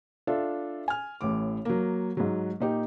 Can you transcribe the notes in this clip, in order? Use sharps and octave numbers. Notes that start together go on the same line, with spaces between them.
D4 F4 A4 E5
G#5 F6
A1 A2 D6
F#3 A#3
G#2 F#3
A#2 D#4 G4